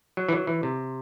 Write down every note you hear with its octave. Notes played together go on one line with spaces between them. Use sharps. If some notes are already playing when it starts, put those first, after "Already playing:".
F#3
E3
F#3
E3
C3